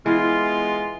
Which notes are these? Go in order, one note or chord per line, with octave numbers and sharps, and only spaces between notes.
E3 G#3 B3 F4